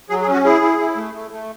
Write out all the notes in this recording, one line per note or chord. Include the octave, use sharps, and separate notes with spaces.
F#3 G#4
G#4
C#4
F#4
E4 G#4
E4
E4
A3
A3
A3